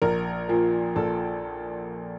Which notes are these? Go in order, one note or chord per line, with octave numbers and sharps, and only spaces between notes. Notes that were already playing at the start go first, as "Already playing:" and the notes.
A#1 A#4
A#2 F3 A#3
A#1 A4